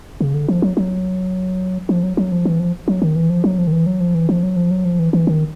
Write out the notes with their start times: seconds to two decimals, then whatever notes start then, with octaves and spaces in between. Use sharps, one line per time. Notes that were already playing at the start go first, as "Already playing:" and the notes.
0.21 C#3
0.34 D3
0.48 F3
0.62 F#3
0.77 F#3
1.89 F3
2.03 F#3
2.17 F#3
2.32 F3
2.45 E3
2.60 F3
2.88 F#3
3.02 D#3
3.16 E3
3.30 F3
3.44 F#3
3.59 F3
3.67 D#3
3.72 E3
3.86 F#3
4.01 F3
4.15 E3
4.29 F3
4.43 F#3
4.56 F3
4.71 F#3
4.85 F3
4.99 E3
5.13 E3
5.27 D#3